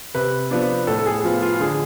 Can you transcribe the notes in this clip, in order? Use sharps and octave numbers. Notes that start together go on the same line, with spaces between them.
C3 B4
F3 B3 D4
A2 A4
A4
G#4
F3 B3 F4
F4
F4
D3 G#4